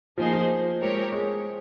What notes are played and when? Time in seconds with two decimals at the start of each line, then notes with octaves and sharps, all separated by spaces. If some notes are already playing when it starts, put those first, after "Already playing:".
0.18 F3 A#3 D#4 G#4 C5
0.33 F3
0.81 G#3 C4 G4 A#4 C#5
1.12 G#3